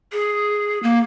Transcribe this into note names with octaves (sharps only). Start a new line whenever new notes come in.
G#4
A#3